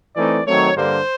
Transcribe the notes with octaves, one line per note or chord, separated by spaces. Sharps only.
E3 A3 C4 D#4 D5
D#3 F#3 A3 C4 C#5
G2 D3 G3 A#3 C5